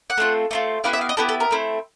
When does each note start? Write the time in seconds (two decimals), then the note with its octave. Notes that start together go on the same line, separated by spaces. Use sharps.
0.10 F#5
0.18 A3 C4 F4
0.51 A3 C4 F4
0.84 B3 E4 G4 F5
0.93 E5
1.01 F5
1.09 D#5
1.17 B3 E4 G4 A4
1.29 A4
1.40 A#4
1.51 A3 C4 E4